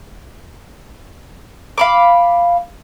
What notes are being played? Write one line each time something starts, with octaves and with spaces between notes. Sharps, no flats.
F5 B5 D6